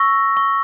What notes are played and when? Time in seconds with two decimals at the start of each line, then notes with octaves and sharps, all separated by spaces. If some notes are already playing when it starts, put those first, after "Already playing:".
Already playing: C#6 E6 A#6
0.37 C#6